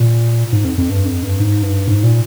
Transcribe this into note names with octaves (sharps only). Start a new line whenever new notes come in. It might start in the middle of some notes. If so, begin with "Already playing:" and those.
Already playing: A#2
G#2
F2
F2
G2
F2
G2
G#2
G2
G#2
A#2